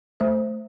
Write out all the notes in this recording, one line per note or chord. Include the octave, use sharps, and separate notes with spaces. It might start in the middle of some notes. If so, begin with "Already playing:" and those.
A3 C5